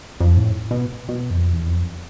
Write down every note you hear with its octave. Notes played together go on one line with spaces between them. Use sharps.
F2
A2
B2
B2
F2
E2
F2